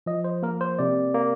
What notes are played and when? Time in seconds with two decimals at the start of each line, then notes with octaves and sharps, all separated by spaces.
0.06 F3 D#5
0.24 C5
0.43 A#3 A#4
0.61 C5
0.79 C3 D5
1.14 A#3